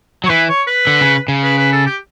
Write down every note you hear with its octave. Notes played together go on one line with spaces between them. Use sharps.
F#3 C#5
E3 B4
C#5
B4
D3
C#3
C#3
B4
B4
A4
G4